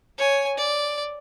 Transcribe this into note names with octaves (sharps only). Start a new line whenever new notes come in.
C#5 G#5
D5